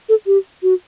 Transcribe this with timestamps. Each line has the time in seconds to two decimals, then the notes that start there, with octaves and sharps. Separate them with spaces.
0.09 A4
0.27 G4
0.63 F#4